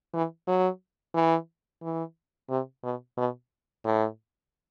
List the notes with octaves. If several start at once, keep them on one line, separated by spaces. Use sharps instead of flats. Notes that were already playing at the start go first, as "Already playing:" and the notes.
E3
F#3
E3
E3
C3
B2
B2
A2